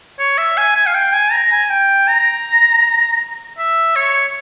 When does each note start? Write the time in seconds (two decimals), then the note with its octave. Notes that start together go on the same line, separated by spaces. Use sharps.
0.19 C#5
0.38 E5
0.57 G#5
0.76 G#5
0.87 F5
0.95 G5
1.13 G#5
1.32 A#5
1.51 G#5
1.70 G5
2.08 A#5
3.58 E5
3.96 C#5